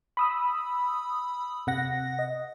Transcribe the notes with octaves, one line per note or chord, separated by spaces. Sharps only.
B5 D#6 E6
C3 F#5 A#6
D#5